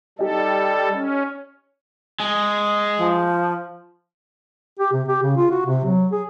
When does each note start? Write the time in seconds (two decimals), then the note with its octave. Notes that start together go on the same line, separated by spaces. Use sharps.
0.19 G3 D#4 G4 A4
0.93 C#4
2.20 G#3
2.98 F3
4.79 G4
4.93 C3
5.08 G4
5.23 C#3
5.37 F4
5.51 F#4
5.65 C3
5.85 F#3
6.11 G#4